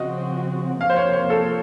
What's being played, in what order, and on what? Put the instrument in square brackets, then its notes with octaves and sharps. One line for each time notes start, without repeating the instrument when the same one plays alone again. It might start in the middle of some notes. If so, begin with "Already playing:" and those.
Already playing: [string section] C#3 F3 C4 F#4 [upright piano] D#5
[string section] C3 F3 A#3 [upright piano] F5
[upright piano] C5
C#5
C5
A4